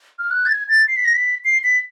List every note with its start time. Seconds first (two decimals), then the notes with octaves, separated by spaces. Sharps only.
0.19 F6
0.31 F#6
0.46 A6
0.50 G#6
0.69 A6
0.88 C7
0.96 B6
1.05 A#6
1.14 B6
1.45 C7
1.64 B6